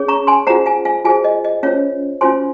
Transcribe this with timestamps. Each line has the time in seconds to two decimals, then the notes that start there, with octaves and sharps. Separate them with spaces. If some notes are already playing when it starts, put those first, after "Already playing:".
Already playing: C#4 G#4 C#5
0.08 A#5 C#6
0.27 G#5 C6
0.47 F4 G#4 C5 F#5 A#5
0.66 F5 G#5
0.85 F5 G#5
1.05 F4 G#4 C5 F5 G#5
1.24 D#5
1.44 D#5
1.63 C#4 F4 C5 C#5 F5
2.21 C#4 F4 C5 G#5 C6